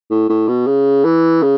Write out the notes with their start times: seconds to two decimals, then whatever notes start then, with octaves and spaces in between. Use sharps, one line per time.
0.10 A2
0.29 A2
0.48 B2
0.67 C#3
1.04 E3
1.42 C#3